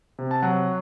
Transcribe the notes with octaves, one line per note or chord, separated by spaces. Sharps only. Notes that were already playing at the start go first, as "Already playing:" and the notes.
C3
A5
F#3 F#5